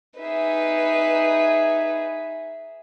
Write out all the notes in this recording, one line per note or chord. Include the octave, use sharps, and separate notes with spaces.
D#4 G#4 B4 E5